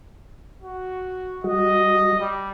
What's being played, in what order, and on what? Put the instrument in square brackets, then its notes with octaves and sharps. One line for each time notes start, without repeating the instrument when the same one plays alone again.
[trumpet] F#4
[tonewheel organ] G3 F#4 [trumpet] D#5
[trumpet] G3